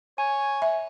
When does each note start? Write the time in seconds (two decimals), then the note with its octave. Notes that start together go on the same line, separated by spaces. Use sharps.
0.18 C#5 G#5
0.62 E5